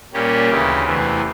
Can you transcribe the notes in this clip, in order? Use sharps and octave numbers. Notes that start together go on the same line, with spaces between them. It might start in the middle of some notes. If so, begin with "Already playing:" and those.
A#2 G3 A#3 C#4 G4
D2 C#3 E3 G4
E2 C3 E3 A3